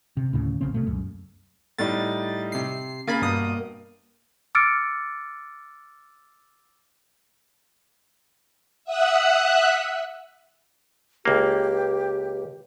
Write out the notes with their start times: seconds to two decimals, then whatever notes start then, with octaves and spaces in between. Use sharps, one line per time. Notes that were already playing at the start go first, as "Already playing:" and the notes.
0.17 C3
0.33 D2 A2 C#3
0.61 A#1 G2 C#3 C4
0.74 B2 A3
0.87 C#2 F#2
1.78 A2 G3 D#4 A6
2.52 C3 C7
3.07 C#3 A#3 G#5 B5 A6
3.22 G2 B2 D#6
4.55 D6 E6 F6 A6 C#7 D7
8.85 E5 F#5 D#6 E6 F#6
11.25 C#2 A#3 G4